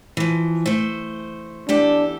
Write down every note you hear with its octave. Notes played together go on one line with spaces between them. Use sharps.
E3 F3
A3 C5
E2 D4 G4 A4